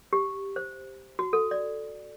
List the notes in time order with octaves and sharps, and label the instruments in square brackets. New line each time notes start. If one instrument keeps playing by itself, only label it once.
[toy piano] G4
C5
F#4
A4
D5